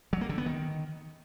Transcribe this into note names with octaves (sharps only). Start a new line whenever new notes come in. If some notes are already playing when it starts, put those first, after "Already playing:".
F#3
A#3
D3
B3
D#3